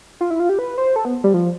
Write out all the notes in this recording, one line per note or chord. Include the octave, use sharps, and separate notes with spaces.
F4
E4
F4
G4
B4
C5
A4
B3
G3
F3